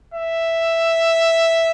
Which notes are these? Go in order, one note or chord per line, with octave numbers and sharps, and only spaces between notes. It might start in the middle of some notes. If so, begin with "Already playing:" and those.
E5